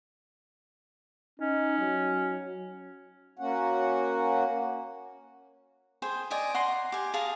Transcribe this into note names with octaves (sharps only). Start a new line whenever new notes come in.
C#4 D#4
F#3
A#3 C#4 F#4 F#5
G#4 C5 G5 G#5
D5 D#5 G5 G#5
F#5 A#5 C6
G4 G#5
G#4 F5 A5 A#5